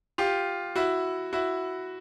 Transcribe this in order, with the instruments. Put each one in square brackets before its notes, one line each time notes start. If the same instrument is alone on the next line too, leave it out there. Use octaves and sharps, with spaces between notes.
[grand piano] F4 G4
E4 F#4
E4 F#4